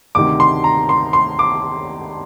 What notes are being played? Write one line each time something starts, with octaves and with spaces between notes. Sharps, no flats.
D2 C3 D#3 D6
C6
A#5
C6
C6
D6